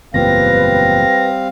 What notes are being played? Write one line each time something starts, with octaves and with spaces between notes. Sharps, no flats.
F#1 E2 A#2 G3 C4 B4 F5 A#6